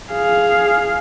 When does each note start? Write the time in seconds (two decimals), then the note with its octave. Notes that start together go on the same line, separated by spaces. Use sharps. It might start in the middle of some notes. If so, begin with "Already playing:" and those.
0.12 G#4 F5